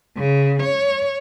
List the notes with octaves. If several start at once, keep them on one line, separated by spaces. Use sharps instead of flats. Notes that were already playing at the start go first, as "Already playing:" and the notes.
C#3
C#5